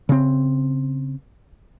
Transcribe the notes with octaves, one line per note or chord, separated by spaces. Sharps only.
C#3 C4